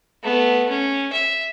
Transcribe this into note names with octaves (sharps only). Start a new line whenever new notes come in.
A3 B3
C#4
E5